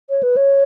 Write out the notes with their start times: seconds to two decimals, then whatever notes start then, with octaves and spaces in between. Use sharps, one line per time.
0.10 C#5
0.23 B4
0.37 C#5